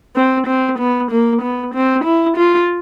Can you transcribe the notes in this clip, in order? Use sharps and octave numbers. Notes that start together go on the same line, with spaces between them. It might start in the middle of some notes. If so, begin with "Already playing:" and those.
C4
C4
B3
A#3
B3
C4
E4
F4